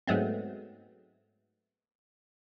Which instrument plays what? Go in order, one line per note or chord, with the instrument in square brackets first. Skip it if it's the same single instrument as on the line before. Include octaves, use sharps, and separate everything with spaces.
[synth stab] G#2 F#3 G#3 A3 B3 C4